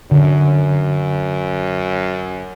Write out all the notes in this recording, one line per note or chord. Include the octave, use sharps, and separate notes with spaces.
F#2 D3